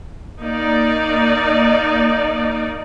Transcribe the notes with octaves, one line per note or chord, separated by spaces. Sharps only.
A#3 D#4 D5